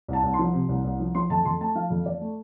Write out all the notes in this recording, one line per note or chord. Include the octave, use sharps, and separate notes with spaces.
C2 A5
C2
C6
F3
C3
C2
C2
F3
F3 C6
F2 A5
F2 C6
A3 A5
F3 F5
F2
F2 D5
A3